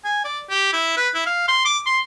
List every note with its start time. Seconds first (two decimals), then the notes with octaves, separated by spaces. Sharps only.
0.04 G#5
0.24 D5
0.50 G4
0.73 E4
0.97 B4
1.14 E4
1.26 F5
1.48 C6
1.65 D6
1.86 C6